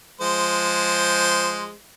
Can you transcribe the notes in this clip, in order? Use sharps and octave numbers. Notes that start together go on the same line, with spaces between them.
F3 G#3 C5